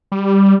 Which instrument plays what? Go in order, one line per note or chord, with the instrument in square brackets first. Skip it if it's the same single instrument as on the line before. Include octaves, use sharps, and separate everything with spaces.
[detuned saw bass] G3